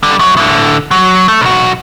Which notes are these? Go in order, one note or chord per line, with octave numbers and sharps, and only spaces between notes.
D3 G3
F#2 F#3
A2 D3
F#3
A3
B1 F#4